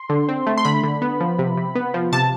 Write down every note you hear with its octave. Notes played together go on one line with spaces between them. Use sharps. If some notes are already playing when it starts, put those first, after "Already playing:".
Already playing: C6
D3
C4
A3
C6
D3 B5
D3
B3
F3
C3
C3
B3
F3
C3 A5